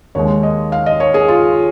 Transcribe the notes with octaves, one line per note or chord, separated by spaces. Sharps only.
D#2 D#3 G#3 C#5
D#5
F5
D#5
C#5
G#4
F4